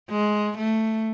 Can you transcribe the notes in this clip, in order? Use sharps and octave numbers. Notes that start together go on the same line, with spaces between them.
G#3
A3